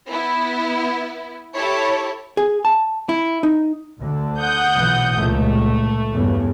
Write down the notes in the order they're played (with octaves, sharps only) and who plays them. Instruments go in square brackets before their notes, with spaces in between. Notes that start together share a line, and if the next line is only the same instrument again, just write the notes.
[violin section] B3 E4
E4 G4 A4 C#5
[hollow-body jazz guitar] G#4
A5
E4
D#4
[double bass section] D2 D3
[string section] F#5 D#6 G6
[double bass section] B1 A#2 E3
[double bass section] C#2 A#2 [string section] A3
[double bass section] E2 G2 C#3